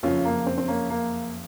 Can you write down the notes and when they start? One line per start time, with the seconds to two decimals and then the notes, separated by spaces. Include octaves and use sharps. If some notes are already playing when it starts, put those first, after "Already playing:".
0.03 F#1 F2 C#3 C#4 F4
0.25 A#3
0.46 C4
0.58 C4
0.68 A#3 C#4
0.90 A#3